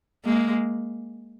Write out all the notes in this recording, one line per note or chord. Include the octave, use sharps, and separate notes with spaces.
G#3 A#3